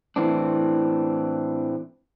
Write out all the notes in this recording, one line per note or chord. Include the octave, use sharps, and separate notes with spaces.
A2 E3 C4 D4